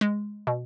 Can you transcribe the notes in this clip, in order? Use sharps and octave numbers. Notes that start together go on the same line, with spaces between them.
G#3
B2